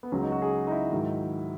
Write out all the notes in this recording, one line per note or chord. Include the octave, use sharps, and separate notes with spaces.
B3
C#2 C#3 F#3 C#4
D#4
F#4
G#4
D#4
E4
G#2 D#3 F#3